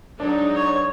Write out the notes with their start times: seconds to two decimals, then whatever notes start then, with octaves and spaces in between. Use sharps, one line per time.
0.20 F#3 G#3 D4 D#4
0.56 C#5